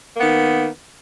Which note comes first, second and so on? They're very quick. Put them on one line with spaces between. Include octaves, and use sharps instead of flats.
A#3 B3 D#3